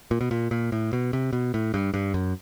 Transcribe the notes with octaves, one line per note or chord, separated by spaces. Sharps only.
A#2
B2
A#2
A#2
A2
B2
C3
B2
A2
G2
G2
F#2